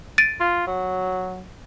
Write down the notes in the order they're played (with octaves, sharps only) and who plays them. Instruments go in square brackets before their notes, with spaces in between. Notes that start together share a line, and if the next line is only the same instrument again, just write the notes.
[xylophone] A6 D7 D#7
[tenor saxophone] F4
F#3